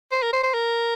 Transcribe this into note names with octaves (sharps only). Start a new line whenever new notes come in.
C5
A#4
C5
C5
A#4